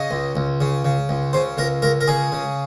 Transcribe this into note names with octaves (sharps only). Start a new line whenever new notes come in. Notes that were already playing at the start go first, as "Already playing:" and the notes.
Already playing: C#3 D#5
C#2
C#2
C#3
C#3
C#2
C#3 C5
C#2 A#4
C#2 A#4
A#4
C#3 G#4
C#3